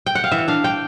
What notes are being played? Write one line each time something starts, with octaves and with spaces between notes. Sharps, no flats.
G5
F#5
F5
E3 E5
D4 F5
G5